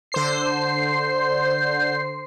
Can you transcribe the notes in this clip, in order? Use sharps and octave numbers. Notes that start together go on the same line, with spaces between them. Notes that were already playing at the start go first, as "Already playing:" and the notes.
D3 C5 C7